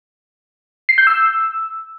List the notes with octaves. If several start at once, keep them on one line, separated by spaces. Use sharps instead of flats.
C7
G6
E6